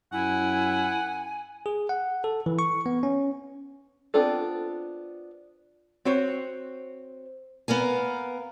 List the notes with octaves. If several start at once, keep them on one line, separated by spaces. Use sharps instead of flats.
F#2 E4 F#5 G#5
G#4
F#5
A4
E3
C#6
B3
C#4
B3 C4 D4 F4 A4
C4 F#4 C5 C#5
B3 A#4 F5 G#5